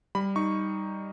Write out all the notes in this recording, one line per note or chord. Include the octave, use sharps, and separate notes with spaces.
G3 B5
D#4 C#6